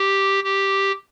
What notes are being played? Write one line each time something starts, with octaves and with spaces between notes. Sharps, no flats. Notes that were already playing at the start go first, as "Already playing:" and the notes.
Already playing: G4
G4